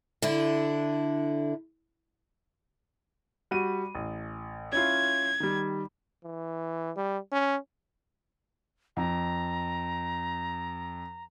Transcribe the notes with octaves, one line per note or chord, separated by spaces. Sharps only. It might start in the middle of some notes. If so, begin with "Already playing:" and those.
D3 D4 E4
G3 F#4 D#7
A1
C#4 E4 F4 G#6
D#3 G3
E3
G3
C#4
F2 A#5